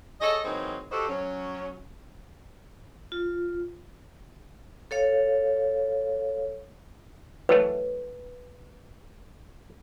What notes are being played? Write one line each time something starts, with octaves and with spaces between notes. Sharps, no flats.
G#4 A4 C#5 D#5
E3 F#3 A#3 C4 D#4 G#4
E4 F#4 G4 A4 C5 D#5
F#3 C#4
F4
A4 C#5 F5
E3 F#3 A3 B4